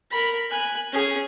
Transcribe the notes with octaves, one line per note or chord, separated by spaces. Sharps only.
A#4 B5
G#5 F#6
C#4 G#4